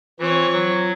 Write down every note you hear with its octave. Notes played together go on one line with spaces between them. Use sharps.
E3 C4 F4 C#5
F#3